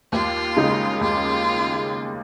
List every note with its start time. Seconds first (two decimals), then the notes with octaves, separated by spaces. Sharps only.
0.12 D#2 F4
0.57 C#3 G#3 D#4
1.01 D#2 F4